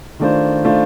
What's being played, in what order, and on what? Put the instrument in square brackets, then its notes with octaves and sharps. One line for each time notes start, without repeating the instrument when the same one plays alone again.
[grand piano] D#3 A3 D4 F4 C5
D#3 A3 D4 F4 C5